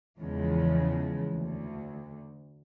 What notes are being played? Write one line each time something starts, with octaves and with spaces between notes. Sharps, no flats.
E2 C#3 F3 G#3
D2